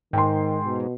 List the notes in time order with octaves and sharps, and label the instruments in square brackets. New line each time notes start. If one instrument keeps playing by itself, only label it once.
[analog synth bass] G#2 [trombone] D#3 [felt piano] G5 C6
[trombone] B2